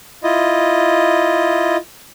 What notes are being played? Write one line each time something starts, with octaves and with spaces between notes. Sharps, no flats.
E4 F4 D#5